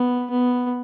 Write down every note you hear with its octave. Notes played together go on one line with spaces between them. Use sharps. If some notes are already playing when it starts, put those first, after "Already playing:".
Already playing: B3
B3